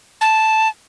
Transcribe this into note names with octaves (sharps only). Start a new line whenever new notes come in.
A5